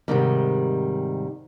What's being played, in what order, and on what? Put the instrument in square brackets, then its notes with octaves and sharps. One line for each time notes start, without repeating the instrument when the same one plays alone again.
[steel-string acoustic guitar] G#2 C3 D#3 G3